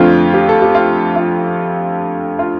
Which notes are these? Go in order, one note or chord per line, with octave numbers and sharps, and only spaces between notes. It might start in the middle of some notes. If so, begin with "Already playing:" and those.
Already playing: F2 D3 A3 C4 F4
G4
A4
G4
F4
F4
F4